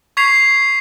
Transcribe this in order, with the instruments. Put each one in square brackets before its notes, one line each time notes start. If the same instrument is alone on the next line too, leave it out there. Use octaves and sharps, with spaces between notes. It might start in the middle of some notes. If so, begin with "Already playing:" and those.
[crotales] C#6 G#6 B6 C7 F7